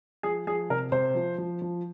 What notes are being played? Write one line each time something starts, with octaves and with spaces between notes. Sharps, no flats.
F3 G#4
F3 G#4
C3 A#4
C3 C5
F3
F3
F3